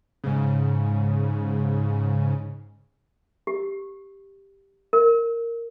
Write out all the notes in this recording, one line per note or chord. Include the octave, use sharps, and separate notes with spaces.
G#2 C#3
G4
A#4